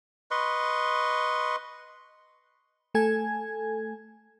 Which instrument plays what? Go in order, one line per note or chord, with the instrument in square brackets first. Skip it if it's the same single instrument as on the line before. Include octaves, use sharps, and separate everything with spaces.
[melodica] B4 D#5 C6 C#6
[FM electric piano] A3 A4 G#5 G#6